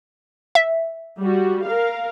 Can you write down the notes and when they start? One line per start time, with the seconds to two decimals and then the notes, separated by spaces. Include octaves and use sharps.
0.55 E5
1.19 G3 F#4
1.64 A#4 F5